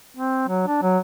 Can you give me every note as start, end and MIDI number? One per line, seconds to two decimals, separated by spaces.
0.17 0.45 60
0.48 0.64 54
0.67 0.79 62
0.82 0.98 54